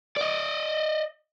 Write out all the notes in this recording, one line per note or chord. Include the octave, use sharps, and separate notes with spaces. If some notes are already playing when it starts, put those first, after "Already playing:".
D5 D#5